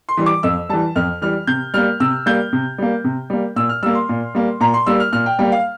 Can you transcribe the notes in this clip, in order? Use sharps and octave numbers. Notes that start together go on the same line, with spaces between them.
C6
E3 G3
D6
F2 E6
E3 G3 A5
F2 F6
E3 G3 F6
C3 G6
G3 A#3 F6
C3 E6
G3 A#3 G6
C3
G3 A#3
C3
G3 A#3
A#2 E6
F6
G3 A#3 E6
C6
A#2
G3 A#3
A#2 A#5
C6
G3 A#3 E6
F6
A#2 F6
G5
G3 A#3 G5
F5